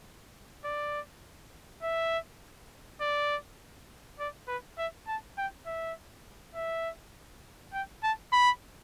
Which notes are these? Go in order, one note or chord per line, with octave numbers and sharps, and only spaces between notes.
D5
E5
D5
D5
B4
E5
A5
G5
E5
E5
G5
A5
B5